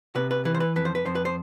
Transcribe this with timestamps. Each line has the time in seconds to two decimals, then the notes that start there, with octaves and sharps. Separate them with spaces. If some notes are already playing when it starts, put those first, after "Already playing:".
0.15 C3 B4
0.31 B4
0.45 E3 B4
0.54 C5
0.60 B4
0.76 F2 B4
0.85 C5
0.95 B4
1.06 F2 C5
1.15 B4
1.25 C5